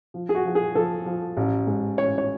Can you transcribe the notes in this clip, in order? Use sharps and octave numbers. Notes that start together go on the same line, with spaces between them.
F3
G#4
F#4
F3
G#4
F3 A4
F3
A1
G#2
A1 C#5
C#5